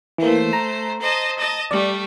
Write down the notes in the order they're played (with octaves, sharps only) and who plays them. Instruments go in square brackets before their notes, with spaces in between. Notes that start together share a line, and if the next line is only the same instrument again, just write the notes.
[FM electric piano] E3 A#3 [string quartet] A3 C5
[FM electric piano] A#5
[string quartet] C5 D#5 A5
D#5 A5
[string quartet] G3 A3 [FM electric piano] D5